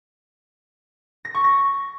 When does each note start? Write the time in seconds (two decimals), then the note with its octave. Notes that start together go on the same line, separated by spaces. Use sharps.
1.25 A#6
1.34 C#6
1.44 A#6